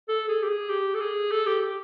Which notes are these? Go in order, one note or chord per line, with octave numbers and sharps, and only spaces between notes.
A4
G#4
G4
G#4
G4
A4
G#4
A4
G4
G4